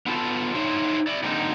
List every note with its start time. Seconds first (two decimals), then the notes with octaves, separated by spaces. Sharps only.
0.06 B3 F4 A4 A5
0.55 D#4 E4 C5 C#5
1.07 E4 D5
1.23 D3 G#3 A#3 C4 D#4